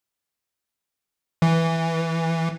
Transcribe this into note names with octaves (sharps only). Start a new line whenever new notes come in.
E3